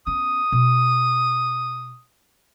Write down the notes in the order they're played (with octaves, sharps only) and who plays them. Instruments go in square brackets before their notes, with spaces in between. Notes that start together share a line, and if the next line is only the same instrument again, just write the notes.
[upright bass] B3 C#4 [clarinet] D#6
[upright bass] B2